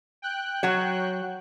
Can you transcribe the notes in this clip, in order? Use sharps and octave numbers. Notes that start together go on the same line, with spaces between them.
G5 F#6
F#3 F#4 C#5